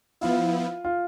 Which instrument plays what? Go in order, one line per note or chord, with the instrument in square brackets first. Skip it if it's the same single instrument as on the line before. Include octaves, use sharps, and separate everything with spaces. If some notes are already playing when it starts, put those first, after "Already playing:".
[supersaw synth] F3 B3 E4 [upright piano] F4
[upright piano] F4